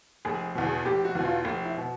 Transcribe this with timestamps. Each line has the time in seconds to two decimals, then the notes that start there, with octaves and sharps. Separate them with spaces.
0.25 F1 G#4
0.55 E2 B2
0.65 G#4
0.85 F1 G4
1.05 F#4
1.15 E2 B2
1.25 F4
1.45 F1
1.65 E4
1.77 B2